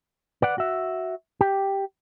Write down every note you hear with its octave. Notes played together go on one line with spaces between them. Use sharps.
B4 D5 F#5
F#4 E5
G4